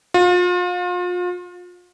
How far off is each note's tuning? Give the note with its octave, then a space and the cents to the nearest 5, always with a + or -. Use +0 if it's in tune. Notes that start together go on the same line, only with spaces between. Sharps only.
F4 +35